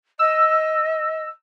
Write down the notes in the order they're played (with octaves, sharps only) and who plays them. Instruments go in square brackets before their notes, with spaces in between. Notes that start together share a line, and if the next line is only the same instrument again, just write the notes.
[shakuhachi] D#5 [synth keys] E6